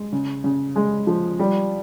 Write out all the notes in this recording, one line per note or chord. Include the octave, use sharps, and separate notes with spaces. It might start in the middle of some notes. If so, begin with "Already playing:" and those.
Already playing: G#3
C#3
C#3
G#3
F3
G3